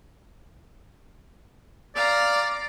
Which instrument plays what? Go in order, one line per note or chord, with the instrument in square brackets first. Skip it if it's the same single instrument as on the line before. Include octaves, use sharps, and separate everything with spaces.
[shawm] D5 [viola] F5 A#5